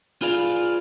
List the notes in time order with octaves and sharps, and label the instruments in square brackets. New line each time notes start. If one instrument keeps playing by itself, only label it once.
[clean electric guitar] F4 G#4 B4 D5 F5